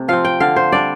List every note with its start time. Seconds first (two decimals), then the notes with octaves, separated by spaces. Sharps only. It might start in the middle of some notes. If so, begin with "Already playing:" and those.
Already playing: C3 A3
0.08 F3 C4 F5
0.25 G5
0.40 D3 F5
0.56 C5
0.72 G3 D4 D5